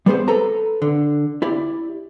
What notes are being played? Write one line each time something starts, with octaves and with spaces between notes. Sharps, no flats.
G3 B3 C4 G#4 C5
A4 B4 A#5
D3
E4 G4 D5